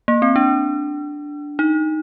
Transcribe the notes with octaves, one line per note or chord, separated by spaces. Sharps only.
A#3
C4
D4
D#4